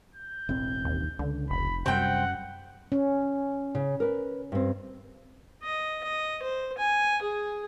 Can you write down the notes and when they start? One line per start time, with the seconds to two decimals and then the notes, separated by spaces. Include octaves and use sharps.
0.15 G6
0.49 E1 A1 C4
0.85 D#2
1.19 C#2 D3
1.50 F1 B5
1.86 F#2 C3 G3 C4 F#5 G5
2.92 C#4
3.75 C#3
4.00 A#4 B4
4.52 G2 C4
5.63 D#5
6.04 D#5
6.42 C5
6.78 G#5
7.22 G#4